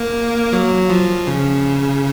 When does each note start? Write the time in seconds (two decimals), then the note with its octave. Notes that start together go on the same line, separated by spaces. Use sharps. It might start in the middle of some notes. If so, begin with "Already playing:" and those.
Already playing: A#3
0.53 F#3
0.90 F3
1.27 C#3